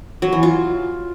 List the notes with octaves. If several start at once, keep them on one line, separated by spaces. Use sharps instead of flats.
F#3
E3
F4